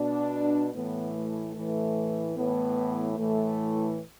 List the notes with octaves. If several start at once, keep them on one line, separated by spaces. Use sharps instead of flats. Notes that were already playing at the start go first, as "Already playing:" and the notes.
Already playing: B2 D4
A2 E3 B3
A3
A2 E3 A3
A2 E3 B3
A2 E3 A3